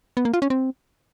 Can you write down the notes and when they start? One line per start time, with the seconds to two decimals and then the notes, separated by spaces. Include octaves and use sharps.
0.17 B3
0.25 A#3
0.34 F4
0.42 C#4
0.50 C4